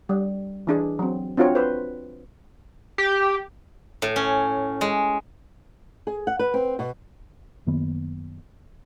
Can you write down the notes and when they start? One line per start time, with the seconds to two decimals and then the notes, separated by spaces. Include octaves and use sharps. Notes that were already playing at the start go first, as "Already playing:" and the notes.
0.09 G3
0.67 E3 D4 G#4
0.99 F#3 C4
1.37 C4 D4 F4 F#4 C#5
1.55 B4 C5
2.98 G4
4.02 A2
4.16 C#4
4.81 G#3
6.07 G#4
6.27 F#5
6.39 B4
6.54 C4
6.79 B2
7.67 F#2 D#3 A#3 B3